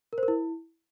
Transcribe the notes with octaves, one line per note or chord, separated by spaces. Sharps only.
A#4
C5
A#4
E4